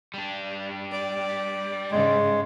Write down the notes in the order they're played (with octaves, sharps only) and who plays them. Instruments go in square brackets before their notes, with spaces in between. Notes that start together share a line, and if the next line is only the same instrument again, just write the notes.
[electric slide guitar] G3 D4
[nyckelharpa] D5
[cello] G#2 C#3 [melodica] G#3